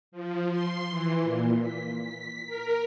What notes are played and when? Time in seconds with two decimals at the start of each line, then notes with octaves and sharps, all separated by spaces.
0.12 F3
0.51 C6
0.89 E3
1.22 A#2
1.60 B6
1.99 B6
2.47 A#4